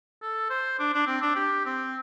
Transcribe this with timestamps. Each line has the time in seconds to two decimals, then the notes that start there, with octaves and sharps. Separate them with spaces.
0.22 A4
0.50 C5
0.79 D4
0.94 D4
1.07 C4
1.22 D4
1.36 G4
1.66 C4